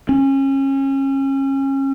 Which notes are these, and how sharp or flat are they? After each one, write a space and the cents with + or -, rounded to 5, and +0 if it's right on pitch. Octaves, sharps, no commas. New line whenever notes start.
C#4 -30